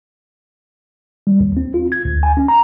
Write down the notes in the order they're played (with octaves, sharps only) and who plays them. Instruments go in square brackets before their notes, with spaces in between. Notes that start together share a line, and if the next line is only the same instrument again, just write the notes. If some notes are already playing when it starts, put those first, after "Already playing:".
[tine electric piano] G3
D#2
C4
F4
G#6
D2
G#5
C#4
A#5